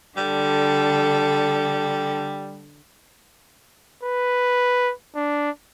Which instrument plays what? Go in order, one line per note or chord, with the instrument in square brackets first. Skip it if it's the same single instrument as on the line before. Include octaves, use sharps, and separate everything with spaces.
[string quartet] D3 A4 [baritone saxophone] G3
[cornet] B4
D4